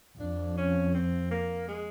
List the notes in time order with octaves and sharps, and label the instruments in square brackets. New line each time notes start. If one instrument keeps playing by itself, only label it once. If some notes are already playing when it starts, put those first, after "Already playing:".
[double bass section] F2 [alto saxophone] D4
[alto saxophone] C#4
C4
A#3
G#3